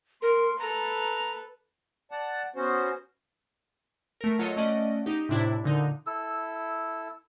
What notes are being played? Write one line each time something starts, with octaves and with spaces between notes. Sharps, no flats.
A#4 C6
A4 B4 A#5
D5 F#5 A5
B3 C#4 F#4 C5
A3 A#4
F#3 F4 A4 C#5 D#5
A3 C#4 D5 D#5 F#5
D#4 G4
A2 C3 D4 E4
A#2 D3 D#4
E4 A4 E6